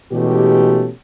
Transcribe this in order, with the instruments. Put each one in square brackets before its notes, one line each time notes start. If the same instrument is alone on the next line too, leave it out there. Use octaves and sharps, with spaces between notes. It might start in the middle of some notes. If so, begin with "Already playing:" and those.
[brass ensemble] B2 E3 G#3 A3 C#4 G4